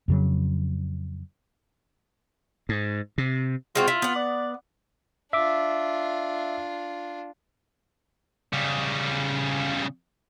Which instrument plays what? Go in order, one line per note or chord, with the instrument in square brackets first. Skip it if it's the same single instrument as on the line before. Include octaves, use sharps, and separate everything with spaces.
[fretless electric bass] F2 C#3 F#3
[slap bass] G#2
C3
[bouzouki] G#3 C4 F#4 [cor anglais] F4
[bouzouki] E4
B3 F#5
[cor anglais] D5
[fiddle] D4 F4 [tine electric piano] E5 D6
[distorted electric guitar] C#3 G3